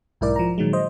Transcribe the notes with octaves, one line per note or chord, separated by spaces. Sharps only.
B1 G#2 E4 A#4 D5
F3 A#5
A#2 D#3 F#3 G#3
C5 D#5